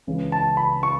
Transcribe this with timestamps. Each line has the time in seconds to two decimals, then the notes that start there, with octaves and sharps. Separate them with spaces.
0.07 C#2 C#3 E3
0.32 A5
0.57 B5
0.83 C#6